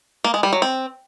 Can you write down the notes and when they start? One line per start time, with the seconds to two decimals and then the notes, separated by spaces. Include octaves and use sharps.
0.24 A#3
0.34 G#3
0.43 G3
0.53 F#3
0.62 C4